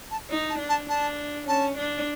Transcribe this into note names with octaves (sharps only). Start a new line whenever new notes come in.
A5
D#4
A5
D4
A5
D4 A5
C#4 A5
D4